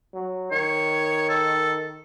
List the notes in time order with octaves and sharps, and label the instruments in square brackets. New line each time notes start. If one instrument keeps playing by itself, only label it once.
[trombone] F#3
[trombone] D#3 [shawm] C#5
[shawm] A4